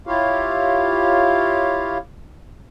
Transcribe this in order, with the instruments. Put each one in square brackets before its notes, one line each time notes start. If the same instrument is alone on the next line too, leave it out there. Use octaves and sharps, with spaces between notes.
[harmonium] E4 F4 G4 C#5 F5